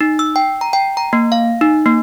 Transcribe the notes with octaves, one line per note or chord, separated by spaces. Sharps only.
D#4
E6
G5
A#5
G5
A#5
A#3
F5
D#4
A#3